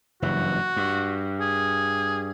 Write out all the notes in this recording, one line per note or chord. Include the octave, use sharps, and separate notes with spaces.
F#1 G2 E3 F#4
G2
G#4